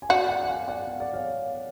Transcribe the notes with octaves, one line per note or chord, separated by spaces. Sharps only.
G#5
F#4 D5 F#5
D5 F#5
F#5
F5 G#5
D5 F#5
F5
D5
C#5 F5